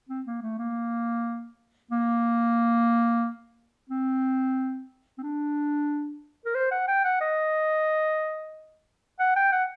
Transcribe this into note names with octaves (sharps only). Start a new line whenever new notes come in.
C4
A#3
A3
A#3
A#3
C4
C4
D4
A#4
C5
F#5
G5
F#5
D#5
F#5
G5
F#5